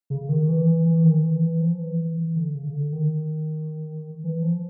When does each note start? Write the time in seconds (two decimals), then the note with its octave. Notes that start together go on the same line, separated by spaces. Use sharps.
0.10 C#3
0.29 D#3
0.49 E3
0.66 E3
0.86 E3
1.04 D#3
1.23 E3
1.42 E3
1.61 F3
1.80 E3
1.99 E3
2.17 E3
2.36 D3
2.55 C#3
2.70 C#3
2.73 D3
2.92 D#3
4.24 E3
4.42 F3